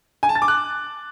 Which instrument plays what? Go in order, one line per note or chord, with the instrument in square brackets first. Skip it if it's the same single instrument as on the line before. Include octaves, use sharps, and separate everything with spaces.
[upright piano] G#5
A5
A6
D6
F#6